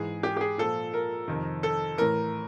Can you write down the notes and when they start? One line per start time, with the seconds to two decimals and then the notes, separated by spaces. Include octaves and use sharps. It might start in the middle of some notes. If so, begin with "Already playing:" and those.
Already playing: G#2 E3 G#4
0.23 G4
0.37 G4
0.41 G#4
0.58 A#2 F3 A4
0.93 A#4
1.28 F2 C3 D#3
1.63 A4
1.98 A2 E3 A#4